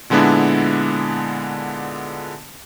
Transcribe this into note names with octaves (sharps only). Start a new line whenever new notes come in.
A#2 D3 G#3 B3 D4 E4